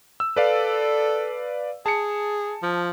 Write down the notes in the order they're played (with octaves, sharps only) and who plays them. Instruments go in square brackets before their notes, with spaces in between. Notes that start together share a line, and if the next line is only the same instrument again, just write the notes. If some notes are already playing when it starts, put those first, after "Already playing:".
[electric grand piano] E6
[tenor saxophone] A4 [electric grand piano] B4 D5 F5
[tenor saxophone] G#4 [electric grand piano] A5 C#7
[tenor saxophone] F3